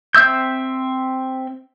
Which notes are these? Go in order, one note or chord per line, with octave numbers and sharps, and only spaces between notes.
C4 E5 E6 G6